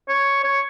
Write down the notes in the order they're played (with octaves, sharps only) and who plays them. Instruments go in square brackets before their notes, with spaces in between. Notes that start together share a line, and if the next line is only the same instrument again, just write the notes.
[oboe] C#5
C#5